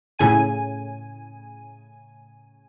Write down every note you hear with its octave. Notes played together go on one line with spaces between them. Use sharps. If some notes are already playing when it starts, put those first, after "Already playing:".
A2 C#3 G#5 D#7